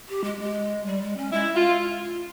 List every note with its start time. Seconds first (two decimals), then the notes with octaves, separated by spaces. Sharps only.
0.09 G4
0.24 G#3
0.40 G#3
0.86 G3
1.02 G#3
1.17 C#4
1.32 G#3 E4
1.55 F4